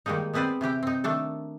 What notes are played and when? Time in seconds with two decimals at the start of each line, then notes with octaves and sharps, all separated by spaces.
0.06 D#3 G3 G#3 A#3 D#4
0.33 G#3 B3 C4 B4 C5 D5
0.61 C3 E3 G4 G5
0.83 C4 D#4
1.04 D#3 A3 D4 A4